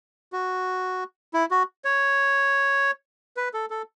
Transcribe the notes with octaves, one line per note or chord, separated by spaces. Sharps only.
F#4
E4
F#4
C#5
B4
A4
A4